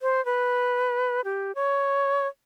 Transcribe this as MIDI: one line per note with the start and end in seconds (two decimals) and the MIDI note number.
0.01 0.23 72
0.25 1.21 71
1.25 1.52 67
1.55 2.27 73